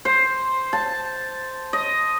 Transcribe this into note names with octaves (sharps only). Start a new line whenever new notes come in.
C5
A5
D#5